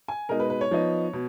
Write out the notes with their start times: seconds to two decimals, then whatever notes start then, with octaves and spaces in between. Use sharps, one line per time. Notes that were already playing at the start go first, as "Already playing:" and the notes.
0.08 G#5
0.29 B2 G#3 D#4 A#4
0.40 B4
0.50 B4
0.61 C#5
0.71 F3 B3 D#4
1.13 B2